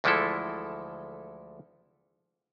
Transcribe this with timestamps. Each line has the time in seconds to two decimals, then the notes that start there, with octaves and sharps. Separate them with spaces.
0.04 D2 E3 F3 G#3 E4 A4